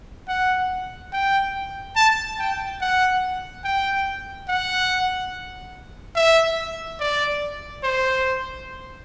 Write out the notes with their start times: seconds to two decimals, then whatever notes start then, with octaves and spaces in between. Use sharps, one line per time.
0.28 F#5
1.13 G5
1.96 A5
2.39 G5
2.81 F#5
3.64 G5
4.48 F#5
6.16 E5
7.00 D5
7.84 C5